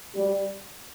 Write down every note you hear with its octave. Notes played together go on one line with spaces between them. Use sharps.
G3